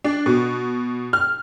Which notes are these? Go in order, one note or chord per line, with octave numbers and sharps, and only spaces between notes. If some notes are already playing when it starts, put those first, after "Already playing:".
D4
B2
F6